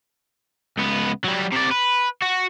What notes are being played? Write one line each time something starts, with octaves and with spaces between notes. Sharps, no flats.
C#2 B3
F#3 G3
C3 D5
B4
F#4